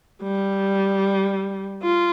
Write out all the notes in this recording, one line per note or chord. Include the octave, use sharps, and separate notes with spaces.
G3
F4